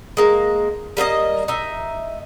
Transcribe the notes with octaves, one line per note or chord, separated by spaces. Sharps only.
G#3 A#3
G3 A#3 D4 D#5
D#4 E5